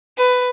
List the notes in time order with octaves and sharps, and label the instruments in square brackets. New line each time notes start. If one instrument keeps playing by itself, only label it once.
[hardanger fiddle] B4